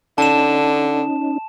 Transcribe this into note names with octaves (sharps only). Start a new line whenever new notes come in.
D3 C#4 D#4 A5 E7